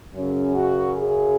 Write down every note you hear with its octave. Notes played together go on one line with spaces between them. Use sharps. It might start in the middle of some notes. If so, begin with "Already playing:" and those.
F#2 C#3 C#4
F#4
G#4